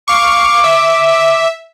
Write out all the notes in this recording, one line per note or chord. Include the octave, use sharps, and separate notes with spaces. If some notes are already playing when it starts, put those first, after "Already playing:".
F5 C#6 D6
E5